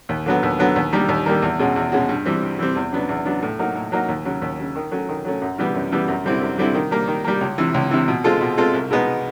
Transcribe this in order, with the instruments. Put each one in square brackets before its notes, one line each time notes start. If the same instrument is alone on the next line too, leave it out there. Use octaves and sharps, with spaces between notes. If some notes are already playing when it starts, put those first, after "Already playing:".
[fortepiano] D#2
D3 F#3 B3
D#2
D3 F#3 B3
D#2
D#3 G3 A#3
D#2
D#3 G3 A#3
E2
B2 G#3 C#4 F#4
E2
B2 G#3 C#4 F#4
G2
E3 G3 C4
G2
E3 G3 C4
E2
C#3 F#3 B3 D4
E2
C#3 F#3 B3 D4
A2
F#3 A#3 D#4 F#4
A2
F#3 A#3 D#4 F#4
D#2
C#3 F#3
D#2
C#3 F#3
D#3
F#3 A3 C#4
D#3
F#3 A3 C#4
F#2
C#3 E3 G3 B3
F#2
C#3 E3 G3 B3
F#2
D3 G3 C4 E4
F#2
D3 G3 C4 E4
D#3
G3 A#3
D#3
G3 A#3
C#2
C3 E3
C#2
C3 E3
B2
G#3 C4 F4 A4
B2
G#3 C4 F4 A4
C2
B2 G#3 B3 D#4